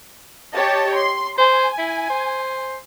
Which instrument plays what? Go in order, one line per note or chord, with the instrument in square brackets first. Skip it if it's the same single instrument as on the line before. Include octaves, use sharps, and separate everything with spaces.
[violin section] G4 C#5 A5 [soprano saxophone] D#5
[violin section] C6
[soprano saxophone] C5 [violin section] G#5
[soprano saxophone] E4
C5